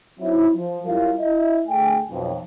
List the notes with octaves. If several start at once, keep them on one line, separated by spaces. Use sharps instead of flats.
F#3 C4 D#4 E4
F3
F#2 G3 E4 F4 A#4 F5
E4 D#5 E5
D2 A3 G#4 G5 G#5
B1 F2